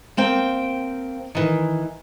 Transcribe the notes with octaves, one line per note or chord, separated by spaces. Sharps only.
A#3 C4 G5
D#3 E3